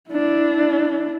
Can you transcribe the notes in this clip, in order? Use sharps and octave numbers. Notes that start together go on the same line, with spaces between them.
D4 E4